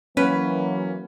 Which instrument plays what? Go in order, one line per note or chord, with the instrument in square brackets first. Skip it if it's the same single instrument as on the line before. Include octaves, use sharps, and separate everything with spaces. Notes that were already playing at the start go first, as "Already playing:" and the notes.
[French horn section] E3 F#3 A#3 [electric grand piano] C#4 [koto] B4